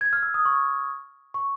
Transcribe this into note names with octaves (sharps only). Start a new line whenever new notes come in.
G#6
F6
E6
D#6
C#6
C#6